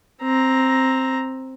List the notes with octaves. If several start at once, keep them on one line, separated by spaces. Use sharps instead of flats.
C4 A#5